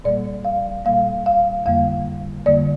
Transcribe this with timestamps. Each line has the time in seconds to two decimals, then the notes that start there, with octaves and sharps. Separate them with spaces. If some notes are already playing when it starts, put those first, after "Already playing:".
0.04 A#2 G3 A#3 D5
0.45 F5
0.85 A#2 G3 A#3 F5
1.26 F5
1.66 F2 D3 G3 A#3 F5
2.46 F2 D3 G3 A#3 D5